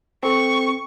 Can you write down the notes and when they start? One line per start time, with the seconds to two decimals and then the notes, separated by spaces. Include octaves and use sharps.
0.23 C4 A4 C#6